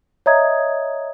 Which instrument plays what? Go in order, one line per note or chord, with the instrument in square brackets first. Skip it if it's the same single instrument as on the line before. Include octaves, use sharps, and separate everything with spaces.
[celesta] C#5 D#5 E5 A#5 D#6 G#6